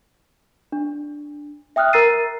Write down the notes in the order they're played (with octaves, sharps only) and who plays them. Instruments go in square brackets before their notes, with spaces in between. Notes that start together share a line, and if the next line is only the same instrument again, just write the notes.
[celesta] D4
E5 G5 D#6 F6 F#6
A#4 A#5 E6 A6 C7 D#7